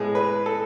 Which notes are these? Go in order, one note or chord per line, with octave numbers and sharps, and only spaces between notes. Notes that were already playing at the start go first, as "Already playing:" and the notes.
Already playing: A2 G#3 B3 G#4
B4
A4